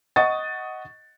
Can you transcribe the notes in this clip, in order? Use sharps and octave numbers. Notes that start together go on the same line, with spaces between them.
D#5 F#5 C#6 D#6 A6